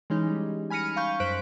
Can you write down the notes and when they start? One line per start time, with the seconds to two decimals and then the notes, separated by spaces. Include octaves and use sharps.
0.10 E3 G#3 C#4 D#4
0.27 G3
0.70 G#5 B5 F6 A#6 C#7 D#7
0.96 F5 B5 C#6 G6
1.20 F#2 C5 F#6 B6 D7